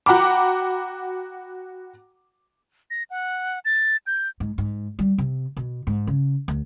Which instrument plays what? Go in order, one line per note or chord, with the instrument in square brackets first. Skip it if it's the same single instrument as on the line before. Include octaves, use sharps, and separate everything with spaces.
[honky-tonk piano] F#4 F#5 G5 A#5 B5 D6
[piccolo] A#6
F#5
A6
G6
[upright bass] G#2
G#2
G3
C3
B2
G#2
C#3
D2